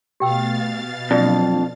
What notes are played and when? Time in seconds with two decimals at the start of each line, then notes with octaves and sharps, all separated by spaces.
0.20 B2 A3 G4 F5 G5 E6 A6
1.11 F2 F#3 A#3 D4 D5